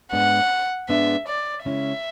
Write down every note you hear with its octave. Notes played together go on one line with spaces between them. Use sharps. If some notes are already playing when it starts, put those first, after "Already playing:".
G#2 G#3 B3 D4 F#5
G#2 G#3 B3 D4 E5
D5
C#3 G#3 C#4 E4 E5